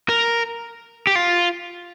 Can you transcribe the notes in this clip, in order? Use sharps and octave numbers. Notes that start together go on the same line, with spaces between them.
A#4
G4
F4